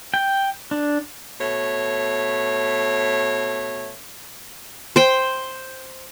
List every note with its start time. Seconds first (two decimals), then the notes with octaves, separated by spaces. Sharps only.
0.14 G5
0.71 D4
1.40 B2 A3 C#5
4.96 C5 G5